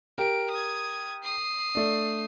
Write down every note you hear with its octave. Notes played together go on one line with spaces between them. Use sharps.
G4 A#4 D7
D#6 G#6
D#6 C7
A3 D4